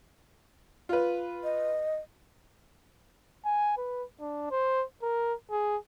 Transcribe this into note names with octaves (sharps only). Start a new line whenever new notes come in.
F4 B4
D#5
G#5
B4
D4
C5
A#4
G#4